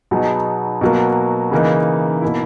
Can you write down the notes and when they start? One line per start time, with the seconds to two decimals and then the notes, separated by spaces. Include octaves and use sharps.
0.11 B2 F#3 B3 D#4 G#4
0.81 B2 F#3 A#3
1.51 C#3 E3 A#3 D#4
2.22 B2 A#3 E4